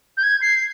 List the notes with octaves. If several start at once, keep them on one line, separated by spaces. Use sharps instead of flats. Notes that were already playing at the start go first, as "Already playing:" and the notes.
G6
G#6
C7